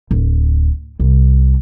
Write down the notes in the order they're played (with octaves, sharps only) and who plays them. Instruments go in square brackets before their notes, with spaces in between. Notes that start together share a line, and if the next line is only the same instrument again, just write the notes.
[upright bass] D1
C2